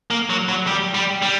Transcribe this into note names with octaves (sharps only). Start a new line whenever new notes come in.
A#3
F#3
F#3
G3
G3
G3